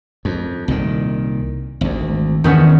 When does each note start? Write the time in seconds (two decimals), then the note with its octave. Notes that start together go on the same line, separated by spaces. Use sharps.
0.25 F2
0.68 C2 A#2 D#3
1.81 G#1 D2
2.44 E2 G2 C3 D#3 B3 C#4